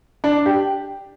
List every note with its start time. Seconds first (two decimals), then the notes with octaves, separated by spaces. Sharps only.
0.24 D4
0.46 G4